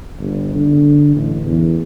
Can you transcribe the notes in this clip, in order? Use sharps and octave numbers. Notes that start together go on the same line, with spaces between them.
G1
D3
A1
E2